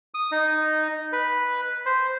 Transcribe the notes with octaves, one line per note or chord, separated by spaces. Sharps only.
D#6
D#4
B4
C5